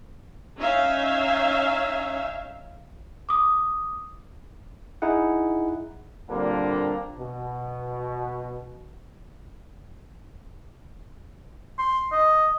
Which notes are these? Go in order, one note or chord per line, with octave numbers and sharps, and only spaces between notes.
C#4 D#4 E5 F5
D6 D#6
D#4 E4 G#4 F#5
A#2 D3 G3 A#3 C4 D4
B2
C6
D#5